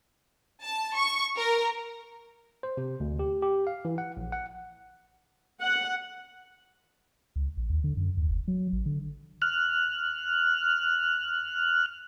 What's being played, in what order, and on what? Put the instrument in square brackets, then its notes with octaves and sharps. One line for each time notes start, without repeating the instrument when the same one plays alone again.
[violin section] A5
C#6
A#4
[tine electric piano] C5
C3
D2
G4
G4
F5
E3
F#5
A#1
F#5
[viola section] F#5
[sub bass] C#2
A#1
D#2
D3
F#2
D#2
F#1
F#3
A1
D3
[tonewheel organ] F6 F#6